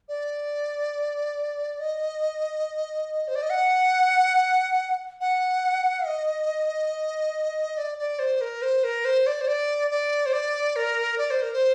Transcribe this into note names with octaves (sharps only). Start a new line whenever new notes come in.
D5
D#5
C5
D5
D#5
F#5
F#5
D#5
D5
D5
C5
A#4
C5
A#4
C5
D5
C5
D5
D5
C5
D5
A#4
D5
C5
A#4
C5